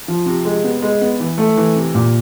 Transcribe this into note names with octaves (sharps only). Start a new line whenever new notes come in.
F3
C3
G#3
B3
G#3
B3
E3
A3
E3
C3
A#2